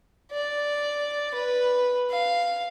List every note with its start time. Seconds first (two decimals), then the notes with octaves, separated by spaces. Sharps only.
0.32 D5
1.34 B4
2.11 F5